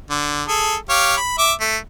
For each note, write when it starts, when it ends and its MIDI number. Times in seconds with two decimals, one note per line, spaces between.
0.10 0.43 50
0.48 0.76 68
0.48 0.76 69
0.89 1.16 67
0.89 1.16 73
0.89 1.16 77
1.17 1.37 83
1.38 1.52 76
1.38 1.52 86
1.60 1.77 57